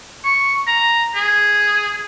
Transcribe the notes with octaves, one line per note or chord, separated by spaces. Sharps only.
C#6
A#5
G#4